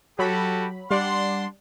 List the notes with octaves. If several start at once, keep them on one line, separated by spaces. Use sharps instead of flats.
F#3 F#4 G4 A4 B5
G3 D4 D5 F#5 C6